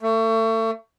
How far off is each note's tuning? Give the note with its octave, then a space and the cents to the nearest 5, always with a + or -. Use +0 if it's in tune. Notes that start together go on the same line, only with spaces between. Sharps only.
A3 +30